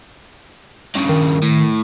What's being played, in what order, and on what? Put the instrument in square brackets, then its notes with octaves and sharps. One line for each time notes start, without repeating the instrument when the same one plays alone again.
[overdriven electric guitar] G2 C#3
[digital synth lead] D#3
[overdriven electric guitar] A2